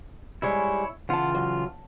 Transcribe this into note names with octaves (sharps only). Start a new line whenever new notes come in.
G#2 G3 G#3 E4 C#5
C#3 E3 F4 F#5 A5
F#3